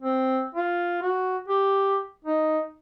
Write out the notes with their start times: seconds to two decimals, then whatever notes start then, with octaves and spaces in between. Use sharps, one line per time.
0.03 C4
0.55 F4
1.02 F#4
1.48 G4
2.25 D#4